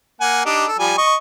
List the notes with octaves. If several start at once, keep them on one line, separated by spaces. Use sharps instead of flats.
A#3 F#5 G#5
D4 D#4 G4
A4
F3 G3 G#5
D#5 C#6